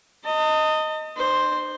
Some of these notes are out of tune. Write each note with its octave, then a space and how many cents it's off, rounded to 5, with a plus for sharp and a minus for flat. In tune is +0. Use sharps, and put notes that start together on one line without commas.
D#5 +0 A5 +45
D#4 -45 C5 +0